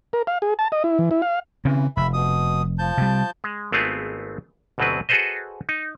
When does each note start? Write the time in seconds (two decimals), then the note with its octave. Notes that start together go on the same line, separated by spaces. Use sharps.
0.13 A#4
0.27 F5
0.42 G#4
0.59 A5
0.72 D#5
0.84 E4
0.99 E3
1.11 E4
1.22 F5
1.65 C#3 E3 C4 C#4
1.97 F1 E5 B5
2.13 B2 D#6
2.79 F3 A5 G6
2.98 C3 G3
3.44 G#3
3.72 G#1 A3 B3 C4 F4 G#4
4.78 G1 D2 B2 F#3 C4 B4
5.09 F#4 G#4 A4 B4 C5 D#5
5.69 D#4